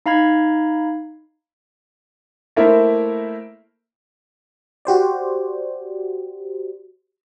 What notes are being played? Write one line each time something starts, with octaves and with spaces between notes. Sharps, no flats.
D#4 F5 A#5 B5 G#6
A3 A#3 E4 A#4 C5
F#4 G4 C5 D5